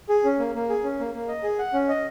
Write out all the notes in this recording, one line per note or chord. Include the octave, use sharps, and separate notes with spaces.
G#4
C#4
A#3
A#3
G#4
C#4
A#3
A#3
D#5
G#4
F#5
C#4
D#5